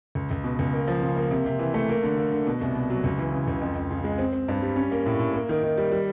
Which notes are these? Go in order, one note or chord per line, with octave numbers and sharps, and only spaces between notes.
C#2
C#2
B2
C#2
A#3
F3
C#3
A#3
C3
C3
E3
A3
A#3
D3
A#3
D3
B2
C2
B2
F#3
C#2
E3
C#3
C#2
F2
F2
C#3
G#3
C4
C4
G2
G3
C#4
A#3
A2
A2
A#3
D#3
D#3
G3
G3